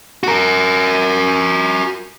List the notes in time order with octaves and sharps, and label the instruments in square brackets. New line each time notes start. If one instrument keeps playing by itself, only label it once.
[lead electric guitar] F#4 A#4